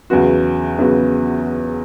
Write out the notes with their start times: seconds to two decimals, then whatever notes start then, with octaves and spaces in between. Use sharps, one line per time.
0.10 E2 C#3 F#3 B3 F#4
0.78 E2 C#3 F#3 B3 F#4